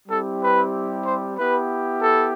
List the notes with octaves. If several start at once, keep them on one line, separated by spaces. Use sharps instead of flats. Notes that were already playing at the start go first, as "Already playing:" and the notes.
G3 C4 E4 G4 A4
B4
C5
B3 E4 G4 B4
A4